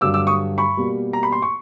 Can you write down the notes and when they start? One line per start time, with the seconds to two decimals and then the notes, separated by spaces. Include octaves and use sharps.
0.01 G2 D3 F#3 D6 E6
0.14 D6 E6
0.27 C#6 D#6
0.58 B5 C#6
0.77 B2 G3 A#3
1.13 A#5
1.23 B5
1.32 C6
1.42 C#6